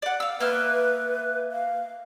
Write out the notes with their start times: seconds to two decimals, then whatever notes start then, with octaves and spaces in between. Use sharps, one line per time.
0.02 D5 F#5
0.20 F5 E6
0.40 A#3 B4 E5 F6
1.52 F5